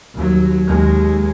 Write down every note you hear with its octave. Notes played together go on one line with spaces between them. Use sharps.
D#2 F#3
D#2 G#3